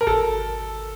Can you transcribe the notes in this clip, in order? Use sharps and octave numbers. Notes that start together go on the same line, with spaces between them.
A#4
G#1 A4